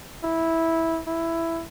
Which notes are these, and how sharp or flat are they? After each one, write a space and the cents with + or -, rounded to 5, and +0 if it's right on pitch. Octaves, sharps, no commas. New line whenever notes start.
E4 -10
E4 +10